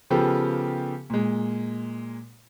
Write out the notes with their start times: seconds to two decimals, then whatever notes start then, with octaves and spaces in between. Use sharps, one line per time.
0.10 C#3 F3 B3 G4 A4
1.10 A#2 G#3